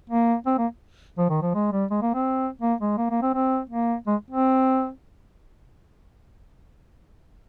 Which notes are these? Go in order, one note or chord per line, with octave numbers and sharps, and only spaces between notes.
A#3
C4
A#3
F3
D#3
F3
G#3
G3
G#3
A#3
C4
A#3
G#3
A#3
A#3
C4
C4
A#3
G#3
C4